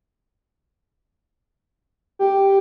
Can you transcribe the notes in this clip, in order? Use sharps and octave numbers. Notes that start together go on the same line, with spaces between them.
G4